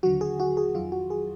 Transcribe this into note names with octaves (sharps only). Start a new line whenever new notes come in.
D#2 D3 F#3 F#4
G#4
F#4
G#4
F2 D#3 F#3 F4
F#4
G#4